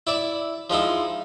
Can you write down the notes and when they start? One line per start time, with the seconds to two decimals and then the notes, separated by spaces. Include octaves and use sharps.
0.07 E4 D5 E5
0.70 F3 G#3 D#4 E4